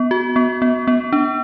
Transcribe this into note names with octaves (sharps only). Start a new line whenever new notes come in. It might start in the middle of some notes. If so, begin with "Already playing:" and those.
Already playing: B3
F#4
B3
B3
B3
D4